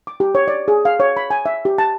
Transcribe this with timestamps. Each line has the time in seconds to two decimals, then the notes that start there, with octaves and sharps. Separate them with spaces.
0.07 D6
0.20 G4
0.35 C#5
0.48 D5
0.68 G#4
0.85 F5
1.00 C#5
1.17 B5
1.30 G#5
1.46 E5
1.65 G4
1.78 A5